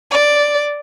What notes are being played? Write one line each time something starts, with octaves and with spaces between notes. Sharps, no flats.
D5